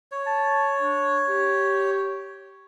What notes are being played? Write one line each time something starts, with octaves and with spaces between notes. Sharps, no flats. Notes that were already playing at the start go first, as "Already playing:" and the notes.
C#5
A5
D4
G4